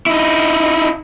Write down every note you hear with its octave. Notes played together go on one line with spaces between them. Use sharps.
D#4 E4